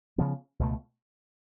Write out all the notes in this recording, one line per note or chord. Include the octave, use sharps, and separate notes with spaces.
C#3 F3 B3
C#2 B2 A3